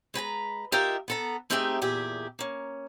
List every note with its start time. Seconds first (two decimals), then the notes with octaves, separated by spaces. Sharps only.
0.14 G#3 B4 G#5 A#5
0.72 F4 G4 A#4 D#5 E5 G5
1.08 B3 A4 A#5
1.50 A3 C4 D#4 G4 G#4 E5
1.82 E2 A#2 G4 G#4 E5
2.39 A#3 C#4